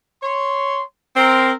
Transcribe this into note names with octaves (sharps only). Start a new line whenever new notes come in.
C#5 C6
C4 A#4